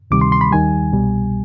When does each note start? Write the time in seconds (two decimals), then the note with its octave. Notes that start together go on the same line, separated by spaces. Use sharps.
0.11 D2 C3 D#3 G3 D6
0.21 C6
0.32 C6
0.41 B5
0.51 D#2 D#3 G3 G#5
0.93 C2 B2 G3